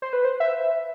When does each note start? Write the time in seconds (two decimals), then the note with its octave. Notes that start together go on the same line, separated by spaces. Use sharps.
0.02 C5
0.13 B4
0.25 C5
0.40 E5